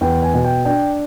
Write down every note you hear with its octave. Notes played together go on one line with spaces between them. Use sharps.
E2 G5
G#5
B2
G5
D4 G5